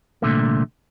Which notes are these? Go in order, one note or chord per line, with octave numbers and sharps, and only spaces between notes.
C2 A#2 D3 A3